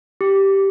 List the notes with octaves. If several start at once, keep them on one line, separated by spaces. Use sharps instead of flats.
G4